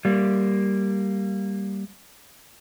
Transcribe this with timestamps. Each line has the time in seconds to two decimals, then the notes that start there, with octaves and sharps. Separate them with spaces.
0.05 G3 A#3